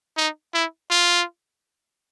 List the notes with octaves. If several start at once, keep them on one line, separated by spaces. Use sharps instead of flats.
D#4
E4
F4